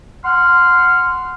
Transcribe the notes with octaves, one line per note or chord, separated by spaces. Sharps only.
F#5 C6 F6